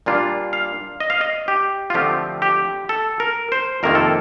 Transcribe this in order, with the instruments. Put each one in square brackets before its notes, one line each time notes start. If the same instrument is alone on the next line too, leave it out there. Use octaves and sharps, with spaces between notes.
[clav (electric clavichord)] A#2 G3 A#3 D4 F4
F5
D#5
F5
D#5
G4
F4
D3 F3 A3 C4 G4
G4
A4
A#4
C5
F2 C3 D#3 A#3 F4 A#4
A4